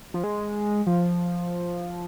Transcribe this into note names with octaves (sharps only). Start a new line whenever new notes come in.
F3
G#3
F3